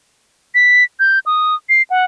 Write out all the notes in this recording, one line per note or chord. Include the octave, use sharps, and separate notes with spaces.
B6
G6
D#6
C7
F#5